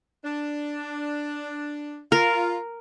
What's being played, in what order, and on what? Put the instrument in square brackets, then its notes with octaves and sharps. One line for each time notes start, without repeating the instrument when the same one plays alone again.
[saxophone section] D4
[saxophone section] F4 [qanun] A#4